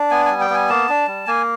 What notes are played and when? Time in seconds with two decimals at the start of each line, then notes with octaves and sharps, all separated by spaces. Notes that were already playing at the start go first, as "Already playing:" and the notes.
Already playing: D4
0.11 B3 G#5
0.25 G#5
0.31 G3
0.41 G5
0.50 B3 G#5
0.69 A#3 A5
0.89 D4
1.08 G3
1.27 A#3 G#5